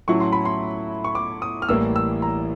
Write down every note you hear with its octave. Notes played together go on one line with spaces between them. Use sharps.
A2 F#3 A3 C#4 E4 C#6
C6
B5
C6
C#6
D6
D#6
F6
A1 A2 E3 G3 A#3 E6
E6
A#5